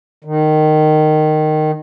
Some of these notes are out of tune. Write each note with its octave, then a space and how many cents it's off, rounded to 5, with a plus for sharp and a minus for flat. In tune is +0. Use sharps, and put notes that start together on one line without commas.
D#3 -15